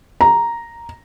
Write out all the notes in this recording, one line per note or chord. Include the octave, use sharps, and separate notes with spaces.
A#5